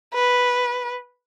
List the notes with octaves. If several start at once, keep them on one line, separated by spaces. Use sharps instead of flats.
B4